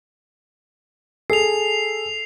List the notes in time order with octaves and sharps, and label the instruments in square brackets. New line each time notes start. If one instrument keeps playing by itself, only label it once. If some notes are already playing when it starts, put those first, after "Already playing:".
[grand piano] G#4 A4 [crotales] C7 F7